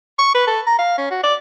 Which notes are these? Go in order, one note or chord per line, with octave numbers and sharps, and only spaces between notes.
C#6
B4
A4
A#5
F5
C#4
F#4
D5